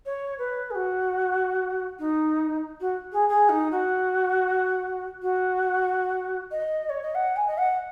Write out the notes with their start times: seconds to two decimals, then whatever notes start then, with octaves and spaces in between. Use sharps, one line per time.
0.06 C#5
0.39 B4
0.71 G#4
0.75 F#4
1.99 D#4
2.81 F#4
3.12 G#4
3.29 G#4
3.49 D#4
3.71 F#4
5.22 F#4
6.51 D#5
6.90 C#5
7.03 D#5
7.15 F#5
7.36 G#5
7.48 D#5
7.58 F#5